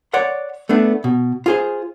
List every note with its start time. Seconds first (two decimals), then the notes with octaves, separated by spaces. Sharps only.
0.13 C#5 D5 F#5 C6
0.69 A3 B3 D4
1.04 B2
1.46 F4 G#4 C5